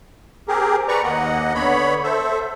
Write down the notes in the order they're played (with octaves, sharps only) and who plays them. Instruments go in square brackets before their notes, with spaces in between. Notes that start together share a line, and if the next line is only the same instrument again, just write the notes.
[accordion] C4 G4 G#4 A#4
B4 D5 A#5 C#6
D#2 A#3 D#5 F#5
D3 B3 C#5 B5
A4 C5 E5